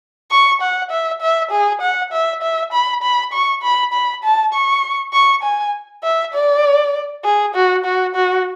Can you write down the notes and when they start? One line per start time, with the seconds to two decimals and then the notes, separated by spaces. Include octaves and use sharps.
0.31 C#6
0.61 F#5
0.91 E5
1.21 E5
1.51 G#4
1.81 F#5
2.12 E5
2.42 E5
2.73 B5
3.03 B5
3.33 C#6
3.63 B5
3.93 B5
4.24 A5
4.53 C#6
5.13 C#6
5.43 G#5
6.04 E5
6.34 D5
7.24 G#4
7.55 F#4
7.85 F#4
8.15 F#4